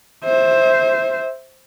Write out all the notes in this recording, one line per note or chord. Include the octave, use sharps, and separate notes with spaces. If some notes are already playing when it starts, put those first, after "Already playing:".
C5 E5